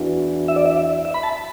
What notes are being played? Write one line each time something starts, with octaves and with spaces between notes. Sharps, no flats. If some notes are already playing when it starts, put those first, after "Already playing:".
Already playing: E2 E3 D4 F#4
E5
D5
E5
E5
B5
A5